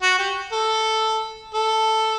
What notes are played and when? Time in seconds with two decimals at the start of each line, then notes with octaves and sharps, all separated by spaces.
0.02 F#4
0.18 G4
0.52 A4
1.54 A4